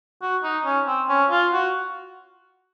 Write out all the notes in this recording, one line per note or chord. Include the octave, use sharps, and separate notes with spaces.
F#4
D#4
C#4
C4
C#4
F4
F#4